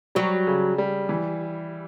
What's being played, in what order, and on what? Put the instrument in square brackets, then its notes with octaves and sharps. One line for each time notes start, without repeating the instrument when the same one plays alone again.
[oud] F#3 [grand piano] G3
[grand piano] C#3
G3
E3